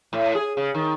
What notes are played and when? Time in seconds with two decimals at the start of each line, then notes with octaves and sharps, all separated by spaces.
0.13 A2
0.35 G#4
0.57 C#3
0.74 D#3